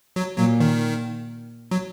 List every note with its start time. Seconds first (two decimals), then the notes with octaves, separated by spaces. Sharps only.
0.16 F#3
0.38 A#2 F#3
0.60 D#3
1.71 F#3